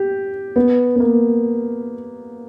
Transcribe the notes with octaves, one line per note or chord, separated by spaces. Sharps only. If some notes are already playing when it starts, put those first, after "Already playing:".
Already playing: G4
B3
B3
A#3